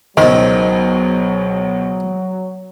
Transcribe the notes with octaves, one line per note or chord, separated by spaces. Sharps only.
C#2 B2 D#3 F#3 C4 C5